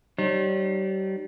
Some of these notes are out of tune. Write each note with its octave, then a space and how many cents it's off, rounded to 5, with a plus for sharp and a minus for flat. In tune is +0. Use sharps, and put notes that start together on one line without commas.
G3 -35 D#4 -40 C#5 -45